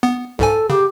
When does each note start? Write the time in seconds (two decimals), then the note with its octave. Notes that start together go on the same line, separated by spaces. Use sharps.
0.03 B3
0.39 C2 G#2 A4 G#5
0.70 C#3 G4